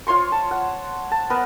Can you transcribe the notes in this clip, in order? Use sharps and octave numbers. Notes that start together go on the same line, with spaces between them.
F4 C#5 C6 C#6
A5
F#5
A5
B3 A#4 B4